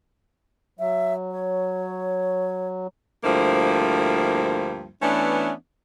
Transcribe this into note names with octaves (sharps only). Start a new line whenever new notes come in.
F#3 E5
C#5
D2 G2 F3 A#3 E4 C5
E3 A3 B3 C#4 D4